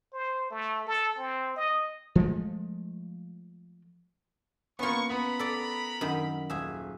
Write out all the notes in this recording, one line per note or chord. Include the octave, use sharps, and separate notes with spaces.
C5
A3
A4
C4
D#5
F3 G#3 A3
A#3 B3 C#4 F4 C#6
B3 A#4 A#5 B5
A4 D5
F#2 D#3
D#1 G#4 E5